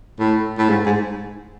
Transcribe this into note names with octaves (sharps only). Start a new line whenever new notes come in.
A2
A2
G#2
G#2